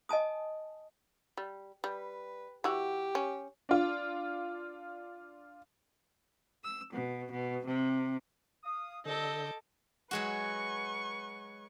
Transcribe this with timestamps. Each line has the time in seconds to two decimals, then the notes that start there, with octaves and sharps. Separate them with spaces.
0.09 D#5 G#5 A5 D#6
1.37 G3
1.84 G3 B4
2.64 E3 F#4 G4
3.15 C#4
3.69 D4 F4
6.63 E6
6.93 B2
7.30 B2
7.66 C3
8.64 F5 D#6
9.06 C2 D3 A4 D#5 A#5 D6 E6 G6
10.11 F#3 G#3 F#4 B4 C#6